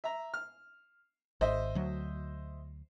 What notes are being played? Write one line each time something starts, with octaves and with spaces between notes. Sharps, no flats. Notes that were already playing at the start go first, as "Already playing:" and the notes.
E5 A#5
F6
G#1 C5 D#5 E5
D2 F#3